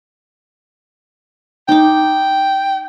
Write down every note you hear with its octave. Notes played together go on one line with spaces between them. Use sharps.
D#4 G5 D6